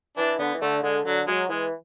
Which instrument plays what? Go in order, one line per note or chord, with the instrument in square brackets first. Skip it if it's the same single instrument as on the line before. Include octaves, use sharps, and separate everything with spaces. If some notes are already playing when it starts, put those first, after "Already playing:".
[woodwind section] E3 [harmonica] D4
[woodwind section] D3 [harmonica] B3
[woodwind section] E3
[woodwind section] D3 [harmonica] A3
[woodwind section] D3 [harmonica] G#3
[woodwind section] D3 [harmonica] F#3
[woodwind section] F#3 [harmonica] G#3
[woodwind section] E3 [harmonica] G#3